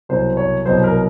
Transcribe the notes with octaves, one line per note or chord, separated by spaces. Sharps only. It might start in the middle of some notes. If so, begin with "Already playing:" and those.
C2 B2 F#3 C5
C#5
C2 B2 F#3 C5
A#4